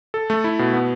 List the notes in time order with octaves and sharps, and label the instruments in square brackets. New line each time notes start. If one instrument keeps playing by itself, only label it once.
[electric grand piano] A4
A3
E4
B2
B3